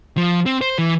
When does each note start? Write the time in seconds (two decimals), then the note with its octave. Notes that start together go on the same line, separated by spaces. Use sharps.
0.17 F3
0.46 C4
0.61 C5
0.78 E3